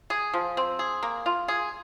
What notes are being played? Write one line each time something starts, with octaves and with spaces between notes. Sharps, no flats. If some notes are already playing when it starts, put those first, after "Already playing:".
G#4
F3
C4
G#4
A#3
F4
G#4